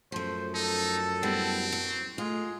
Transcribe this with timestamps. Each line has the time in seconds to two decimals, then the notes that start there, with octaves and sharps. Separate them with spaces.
0.12 F#2 F3 A3 C5
0.54 D#4 A4
1.23 G3 B3 C4 E4
1.72 F#3
2.18 G#3 A3 F4